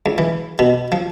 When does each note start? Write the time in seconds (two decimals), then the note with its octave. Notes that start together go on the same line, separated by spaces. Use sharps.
0.06 C#2
0.18 E3
0.59 B2
0.92 F3